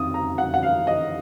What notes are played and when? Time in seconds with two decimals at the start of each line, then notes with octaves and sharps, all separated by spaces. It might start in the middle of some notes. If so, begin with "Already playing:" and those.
Already playing: F2 D#3 D#6
0.14 A#5
0.38 F#5
0.54 F#5
0.63 F5
0.87 D#5